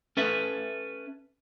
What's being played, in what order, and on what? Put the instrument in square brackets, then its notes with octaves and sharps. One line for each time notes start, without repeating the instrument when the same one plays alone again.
[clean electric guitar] C#4 A4 B4 E5